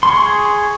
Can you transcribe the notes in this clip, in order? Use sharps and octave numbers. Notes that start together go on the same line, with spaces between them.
G#4 C6 C#6